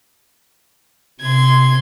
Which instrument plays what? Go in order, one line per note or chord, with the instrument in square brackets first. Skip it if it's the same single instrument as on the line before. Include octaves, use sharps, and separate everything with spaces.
[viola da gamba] C3 [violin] C6 G#6